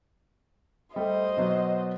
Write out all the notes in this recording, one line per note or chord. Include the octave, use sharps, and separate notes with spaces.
G3 A3 C5 D#5
B2 F#3 F#4